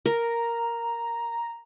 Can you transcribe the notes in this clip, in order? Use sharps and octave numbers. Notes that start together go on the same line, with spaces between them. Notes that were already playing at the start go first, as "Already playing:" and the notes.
A#4 A#5